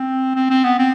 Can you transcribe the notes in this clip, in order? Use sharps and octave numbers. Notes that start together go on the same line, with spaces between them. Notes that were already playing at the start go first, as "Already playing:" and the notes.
Already playing: C4
C4
C4
B3
C4